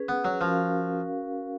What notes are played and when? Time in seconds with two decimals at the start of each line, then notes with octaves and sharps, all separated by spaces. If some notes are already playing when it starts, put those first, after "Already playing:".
Already playing: C#4 G#4 B4
0.09 B3
0.25 F#3
0.41 F3 C#4 F#4 A#4 F5